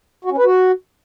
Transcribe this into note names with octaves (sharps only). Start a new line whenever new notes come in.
F#4
C#4
B4
F#4